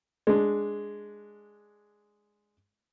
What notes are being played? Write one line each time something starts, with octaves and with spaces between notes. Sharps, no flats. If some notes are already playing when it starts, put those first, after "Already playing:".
G#3 D4